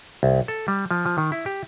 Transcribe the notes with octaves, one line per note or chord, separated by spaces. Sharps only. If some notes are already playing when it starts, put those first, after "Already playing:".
C2
A4
G3
F3
F3
D#3
E4
G4